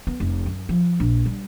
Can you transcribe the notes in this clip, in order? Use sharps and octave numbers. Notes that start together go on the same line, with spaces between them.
B3
F1
F#2
F3
A#1
G3